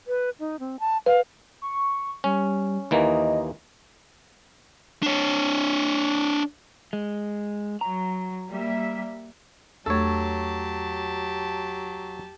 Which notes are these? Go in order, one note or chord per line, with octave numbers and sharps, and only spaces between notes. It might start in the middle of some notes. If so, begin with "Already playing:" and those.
B4
D#4
C4
A5
B4 F5
C#6
G3 C#4
D#2 E3 A#3 D#5
D4 C#5
G#3
F#3 A#5
G3 A#3 E5
E2 F#3 A3 G4 A4 C#5 A5